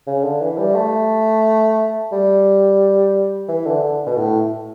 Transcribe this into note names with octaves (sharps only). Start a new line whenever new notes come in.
C#3
D3
E3
G3
A3
G3
E3
D3
D3
B2
A2